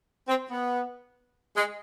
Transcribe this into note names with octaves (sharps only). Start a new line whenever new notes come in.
C4
B3
G#3